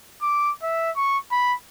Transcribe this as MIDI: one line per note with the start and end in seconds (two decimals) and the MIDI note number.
0.22 0.51 86
0.63 0.91 76
0.96 1.18 85
1.32 1.54 83